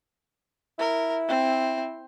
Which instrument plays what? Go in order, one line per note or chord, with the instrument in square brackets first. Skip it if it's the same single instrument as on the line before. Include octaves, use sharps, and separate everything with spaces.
[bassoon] E4 [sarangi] A#4
[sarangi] C4